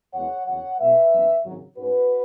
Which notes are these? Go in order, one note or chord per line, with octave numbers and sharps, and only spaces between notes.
F#1 E2 C#3 E3 G#3 C#5 F#5
F#1 E2 C#3 F#3 C#5 F#5
B1 B2 G#3 B4 E5
F#1 E2 C#3 F#3
G#1 F#2 C#3 F#3
G#2 G#3 C#4 F#4 B4